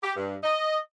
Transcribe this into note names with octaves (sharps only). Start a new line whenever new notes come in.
G4
G2
D#5